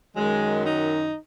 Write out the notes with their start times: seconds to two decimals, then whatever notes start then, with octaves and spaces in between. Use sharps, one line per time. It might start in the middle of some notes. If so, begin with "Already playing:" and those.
0.16 F#2 D#3 F#3 G#3
0.64 D#4